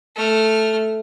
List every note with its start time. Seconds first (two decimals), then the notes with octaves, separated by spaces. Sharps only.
0.16 A3 F6